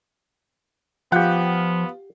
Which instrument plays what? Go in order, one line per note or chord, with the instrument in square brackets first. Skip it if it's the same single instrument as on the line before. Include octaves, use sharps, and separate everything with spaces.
[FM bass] F3 [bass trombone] B3 [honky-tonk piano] F4 [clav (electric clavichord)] G4 F#5